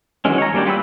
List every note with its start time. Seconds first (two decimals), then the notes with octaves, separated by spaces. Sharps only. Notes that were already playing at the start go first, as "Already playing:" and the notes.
0.25 D#3 E3 F#3 G#3 C#4
0.38 C#5 A#5
0.54 G3 A#3 C#4 D4 G4
0.65 F4 G4 B4 B5 E6